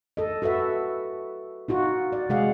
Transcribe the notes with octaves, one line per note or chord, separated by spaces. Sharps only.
A4 D#5
F#4 A4 B4 E5
D#4 F4 F#4
D5
C3 G#3 G#4 F5 F#5